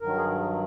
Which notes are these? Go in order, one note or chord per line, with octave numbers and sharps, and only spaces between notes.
G2 D#3 F#3 A#4
G#4